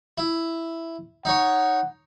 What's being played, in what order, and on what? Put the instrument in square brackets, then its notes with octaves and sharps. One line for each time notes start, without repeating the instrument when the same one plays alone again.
[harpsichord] E4
[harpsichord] D#4 C#5 [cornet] F#5